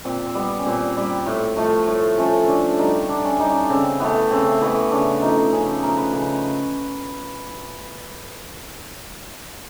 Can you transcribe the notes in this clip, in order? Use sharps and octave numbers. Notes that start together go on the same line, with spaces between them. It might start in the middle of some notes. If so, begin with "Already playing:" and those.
A#2 C4
C4
G3 B3
C#4
A#2 C4
G3
A2
F3 A3
A2
F3 A3 C#4
D3 D4
G3 D#4
D3 D4
C#4
G3 D#4
D4
C#3 C4
E3 A3 B3
C#3 C4
E3 A3 B3
C#3 D4
F3 A3 D#4
C#3 G#4
A4
F3 A3 A#4
B4
C#3 C#5